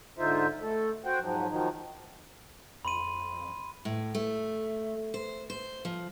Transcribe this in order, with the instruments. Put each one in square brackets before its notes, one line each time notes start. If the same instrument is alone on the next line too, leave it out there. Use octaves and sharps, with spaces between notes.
[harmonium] G#2 D3 D#4 F4 C5 E5
A3 A4
F#4 C5 F#5 G5
G#2 F3 F#3
D#3 F3 F#3 D#4
[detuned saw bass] F2 [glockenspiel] B5 C6 D#7
[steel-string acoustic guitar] A2
A3
C5
C5
F3